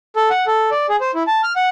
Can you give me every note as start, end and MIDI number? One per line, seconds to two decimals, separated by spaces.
0.16 0.29 69
0.30 0.45 78
0.47 0.70 69
0.71 0.86 74
0.89 0.96 68
1.01 1.11 72
1.15 1.23 64
1.27 1.42 81
1.43 1.53 89
1.56 1.69 78